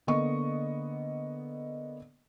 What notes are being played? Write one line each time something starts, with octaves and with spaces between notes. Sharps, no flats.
D3 A#3 B3 D#5 C#6